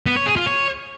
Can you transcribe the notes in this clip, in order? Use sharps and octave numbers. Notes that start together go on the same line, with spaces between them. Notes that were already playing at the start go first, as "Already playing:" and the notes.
B3
C#5
G#4
F4
C#5